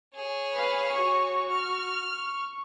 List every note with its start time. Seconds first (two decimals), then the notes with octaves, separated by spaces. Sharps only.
0.15 G#4 C#5
0.53 B4 F5
0.92 F#4 C#6
1.50 F6
2.14 C#6